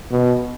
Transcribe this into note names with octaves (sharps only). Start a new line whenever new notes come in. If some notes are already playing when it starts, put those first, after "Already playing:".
B2